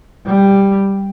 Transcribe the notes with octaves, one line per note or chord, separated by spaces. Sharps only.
G3